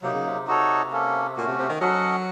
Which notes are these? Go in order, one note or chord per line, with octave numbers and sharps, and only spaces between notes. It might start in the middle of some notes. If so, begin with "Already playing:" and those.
C3 F#3 A#3 D#4
C#3
C3
D#4 F#4 A4 C#5
A#3 C#4 A4
A#2 A3 C#4 F#4
C3
C3
D#3
F#3 C#4 A4 D#5 F#5